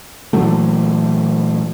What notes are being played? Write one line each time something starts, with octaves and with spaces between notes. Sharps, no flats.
A#2 E3 F#3 A3